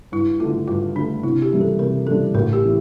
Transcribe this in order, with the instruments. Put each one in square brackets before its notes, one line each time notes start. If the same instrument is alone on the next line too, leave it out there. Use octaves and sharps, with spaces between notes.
[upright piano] G2 [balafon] E4
[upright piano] D3 A3 [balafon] F4
[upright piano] G2 [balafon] F4
[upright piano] D3 A3 [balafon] D4
[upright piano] C3 [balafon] E4
[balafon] G4
[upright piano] E3 G3 A#3 D4
[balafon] A4
[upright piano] C3 [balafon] A#4
[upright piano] E3 G3 A#3 D4 [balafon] A4
[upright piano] A1 [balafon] A#4
[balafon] G4
[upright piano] E3